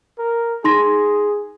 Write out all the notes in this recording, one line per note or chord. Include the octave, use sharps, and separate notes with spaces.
A#4
D#4 G#4 C6 A#6